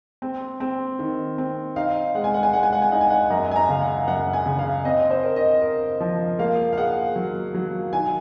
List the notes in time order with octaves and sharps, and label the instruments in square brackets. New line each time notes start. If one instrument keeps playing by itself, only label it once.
[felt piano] C4
C4
D#3
C4
[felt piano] D#4 [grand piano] F5
[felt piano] G#3 [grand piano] F#5
[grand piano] G#5
F#5
G#5
[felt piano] G#3 [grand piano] F#5
[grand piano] G#5
F#5
G#5
[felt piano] D#4 [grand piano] F#5
[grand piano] G#5
F#5
[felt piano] F#2 [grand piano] A#5
[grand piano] G#5
A#5
[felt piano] C#3 [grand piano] F5
[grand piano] F#5
[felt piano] F#2 [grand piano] F#5
[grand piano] G#5
[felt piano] C#3
[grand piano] F5
[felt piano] C4 [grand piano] D#5
[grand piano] C5
[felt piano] A#4
[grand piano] D#5
[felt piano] A#4
F3
[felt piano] A#3 [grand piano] F5
[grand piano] F5
[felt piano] G#4 [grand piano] F#5
[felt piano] F#3
F#3
[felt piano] D#3 [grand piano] G#5